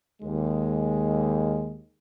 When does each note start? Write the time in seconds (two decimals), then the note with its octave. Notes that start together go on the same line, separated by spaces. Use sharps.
0.22 D#2 G#3